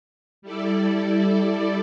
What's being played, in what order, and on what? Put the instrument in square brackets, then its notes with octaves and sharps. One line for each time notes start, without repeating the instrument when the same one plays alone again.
[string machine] G3 E4 A4 D5